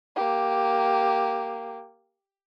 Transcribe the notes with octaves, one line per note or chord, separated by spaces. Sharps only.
A#3 G4